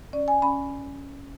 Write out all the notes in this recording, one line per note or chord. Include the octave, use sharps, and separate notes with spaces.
C#4 D5
G#5
C#4 B5